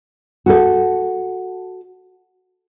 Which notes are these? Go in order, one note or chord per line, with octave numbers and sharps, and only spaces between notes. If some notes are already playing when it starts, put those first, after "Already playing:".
F#4 A4